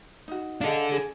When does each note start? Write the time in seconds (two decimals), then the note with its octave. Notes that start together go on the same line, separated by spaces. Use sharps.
0.28 D#4 F#4
0.61 D4 G#4 A4 D#5 F5
0.92 G#4